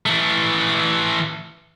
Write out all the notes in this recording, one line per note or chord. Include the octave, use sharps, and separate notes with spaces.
E3 A3